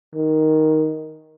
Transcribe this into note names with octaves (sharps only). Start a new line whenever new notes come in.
D#3